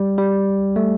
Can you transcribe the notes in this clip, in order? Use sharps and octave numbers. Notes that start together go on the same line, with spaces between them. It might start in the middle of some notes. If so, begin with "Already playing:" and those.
Already playing: G3
G3
A3